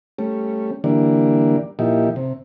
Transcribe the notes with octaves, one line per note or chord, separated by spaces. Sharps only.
G3 A3 C#4
D3 E3 G3 A#3 D4
A#2 F3 D#4 E4 G4
C3